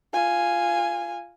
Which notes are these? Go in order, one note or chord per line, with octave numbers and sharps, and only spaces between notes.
F4 G#5